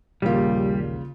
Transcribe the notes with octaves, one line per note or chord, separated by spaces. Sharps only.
A#1 D#2 C#3 G3 A#3 F4